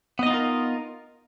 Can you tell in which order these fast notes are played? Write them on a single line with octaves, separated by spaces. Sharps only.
B3 D#5 D#4 F4 A#4